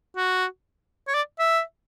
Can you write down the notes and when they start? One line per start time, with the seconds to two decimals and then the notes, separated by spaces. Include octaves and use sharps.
0.16 F#4
1.08 C#5
1.15 D5
1.39 E5